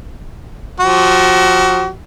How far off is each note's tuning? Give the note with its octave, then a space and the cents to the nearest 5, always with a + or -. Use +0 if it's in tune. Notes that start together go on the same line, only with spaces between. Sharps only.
F3 +30 F#4 +35